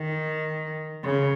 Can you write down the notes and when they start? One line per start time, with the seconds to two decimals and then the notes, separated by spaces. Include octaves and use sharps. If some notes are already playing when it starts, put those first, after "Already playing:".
Already playing: D#3
1.04 C#3